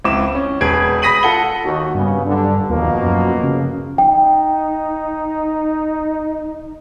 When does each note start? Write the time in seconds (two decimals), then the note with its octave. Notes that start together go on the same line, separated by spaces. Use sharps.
0.04 C#2 C4 E4 D6 E7
0.35 C#4
0.61 E1 G#4 B4 G#6 D7
1.02 B5 D#6 A#6 B6 D#7 F#7
1.23 F4 A4 F#5 G7
1.63 D#2 F#4
1.94 G2 C#3 B3
2.26 D3 F#3
2.69 D#2 B2 F3 A#3
3.02 F#2
3.43 C#3
3.98 D#4 G5